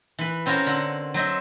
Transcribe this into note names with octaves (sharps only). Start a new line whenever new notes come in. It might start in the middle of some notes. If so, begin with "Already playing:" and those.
E3 B4
C4 C#4 F4 F#4 A#4 C5
D3 F#5
F#3 C5 D#5 E5